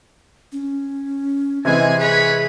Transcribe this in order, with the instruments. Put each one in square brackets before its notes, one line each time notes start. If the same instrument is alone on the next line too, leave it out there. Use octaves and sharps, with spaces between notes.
[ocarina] C#4
[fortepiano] C3 E3 G#3 [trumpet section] G#4 G#5 [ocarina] D#5
[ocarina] G#4 [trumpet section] B4 C#5 B5